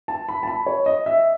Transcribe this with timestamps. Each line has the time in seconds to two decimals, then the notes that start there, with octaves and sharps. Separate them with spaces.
0.08 A5
0.29 B5
0.43 A5
0.48 B5
0.66 C#5
0.86 D#5
1.06 E5